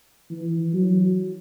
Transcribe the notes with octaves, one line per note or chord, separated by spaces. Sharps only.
E3
F#3